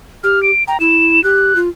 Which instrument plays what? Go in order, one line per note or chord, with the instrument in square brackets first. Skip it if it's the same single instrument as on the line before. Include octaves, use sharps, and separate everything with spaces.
[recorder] G4 [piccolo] F6
[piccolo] D7
[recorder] G5 [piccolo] A#5
[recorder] E4 [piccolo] E7
[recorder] G4 [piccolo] F#6
[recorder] F4